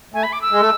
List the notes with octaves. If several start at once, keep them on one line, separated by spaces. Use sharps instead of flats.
A3 G#5
B5
D6
E6
G#3
A3